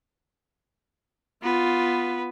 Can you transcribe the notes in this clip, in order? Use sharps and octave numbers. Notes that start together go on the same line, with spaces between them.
B3 F4 B4